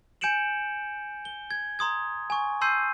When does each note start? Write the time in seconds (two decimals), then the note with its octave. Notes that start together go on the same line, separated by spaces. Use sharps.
0.21 G#5 G6 C#7 D7 E7 F#7
1.25 G7
1.51 G#6
1.79 A#5 C6 D#6 G#6
2.30 G#5 C#6
2.61 A5 C6 E6 G6 C7 D#7